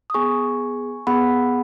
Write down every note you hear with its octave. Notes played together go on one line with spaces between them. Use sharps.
D#6
B3 G#4 G#5 C#6
B3 G#4 F#5 B5